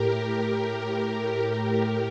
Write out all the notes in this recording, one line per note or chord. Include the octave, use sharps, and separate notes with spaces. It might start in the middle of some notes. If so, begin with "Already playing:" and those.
Already playing: A2 G4 A#4